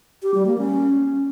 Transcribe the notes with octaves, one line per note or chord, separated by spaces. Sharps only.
G4
G3
A#3
C#4